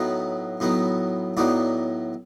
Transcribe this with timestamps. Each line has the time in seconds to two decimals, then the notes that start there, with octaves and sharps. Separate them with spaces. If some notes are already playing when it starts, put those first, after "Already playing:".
Already playing: A2 F#3 B3 D#4
0.60 A2 F#3 B3 D#4
1.37 A2 F#3 B3 D#4 D5